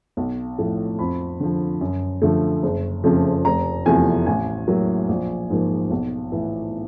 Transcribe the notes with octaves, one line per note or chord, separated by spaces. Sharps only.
B1
A2 F3 A3
F2 B5
D3 F3
F#2
D3 F3 A3
F#1
F2 C#3 F3 A3
F1 A#5
E2 C3 F3 A3 G#5
A1 G#5
A2 F#3 A#3
A#1
G#2 F3 A#3
B1
A2 E3